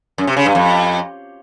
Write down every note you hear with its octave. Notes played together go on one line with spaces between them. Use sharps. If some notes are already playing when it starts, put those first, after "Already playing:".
F#2
C3
C#3
G2
F2